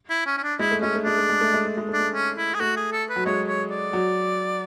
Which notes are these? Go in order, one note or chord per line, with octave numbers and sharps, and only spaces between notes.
E4
C#4
C#4
D4
G#3 E4
A3
G#3 C#4
A3
G#3 D4
A3
G#3
A3
G#3
A3
G#3
A3 D4
G#3
C#4
E4
G#4
A3 F#4
G#4
A4
B4
F#3
G#3 C#5
C#5
D5
F#3